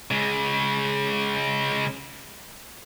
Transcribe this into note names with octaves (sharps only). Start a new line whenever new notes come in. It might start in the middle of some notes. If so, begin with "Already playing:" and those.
C#3 G#3